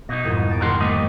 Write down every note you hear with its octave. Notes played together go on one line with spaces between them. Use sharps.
B2 D#4 A#6
C2 F2 G#2
A5 D7
G#1 G4 A#4 F#5 C6
A3 A#3 D#5
C3